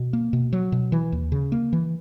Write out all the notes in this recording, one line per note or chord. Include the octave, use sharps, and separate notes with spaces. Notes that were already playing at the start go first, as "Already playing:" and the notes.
Already playing: B2
A#3
B2
F#3
B2
E3
D#2
C#3
A#3
E3